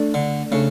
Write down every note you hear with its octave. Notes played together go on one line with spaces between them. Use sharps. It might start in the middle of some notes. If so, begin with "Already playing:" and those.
Already playing: A3 D4 A4 D5
D3
C#3 A3 D4 A4